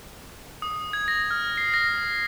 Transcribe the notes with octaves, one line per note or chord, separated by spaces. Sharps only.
D#6
G#6
A#6
F6
C7
A#6